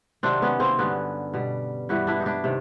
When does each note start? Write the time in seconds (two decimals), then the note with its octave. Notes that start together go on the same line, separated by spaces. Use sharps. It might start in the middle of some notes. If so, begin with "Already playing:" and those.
0.23 C3 D#3 F#3 C4 D4
0.42 B3 C#4
0.60 A#3 C4
0.78 G2 D3 F#3 B3 C#4
1.34 B2 G3
1.89 G2 E3 G3 E4 F#4
2.07 D4 E4
2.20 D#4
2.26 D4 E4
2.44 C3 D#3